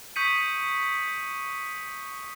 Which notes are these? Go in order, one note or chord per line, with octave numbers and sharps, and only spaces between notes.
C#6 D#6 G6 B6 C#7 D#7